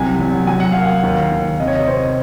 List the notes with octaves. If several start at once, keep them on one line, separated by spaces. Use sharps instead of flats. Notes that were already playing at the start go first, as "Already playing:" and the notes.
Already playing: C2 C3 F#3 G#5
F#3
F#3 G#5
F#5
A#3 F5
F#5
D#2 F5
D#2
C3 D#5
C#5
D#5
C3 C5